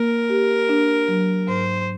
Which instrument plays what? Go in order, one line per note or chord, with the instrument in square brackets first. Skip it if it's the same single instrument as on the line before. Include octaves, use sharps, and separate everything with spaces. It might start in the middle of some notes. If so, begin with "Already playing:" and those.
Already playing: [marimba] A#3 [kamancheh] A#4
[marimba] G4
D4
F#3
[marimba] G#2 [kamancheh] C5